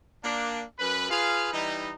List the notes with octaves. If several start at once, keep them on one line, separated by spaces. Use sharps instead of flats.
A#3 D4
F#2 B4
F4 G#4 B4 F5
E3 G3 D#4